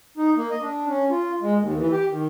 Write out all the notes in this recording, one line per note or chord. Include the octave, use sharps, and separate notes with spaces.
D#4
A#3
D#5
D4
C#4
F4
G#3
D#2
E3
G4
D#3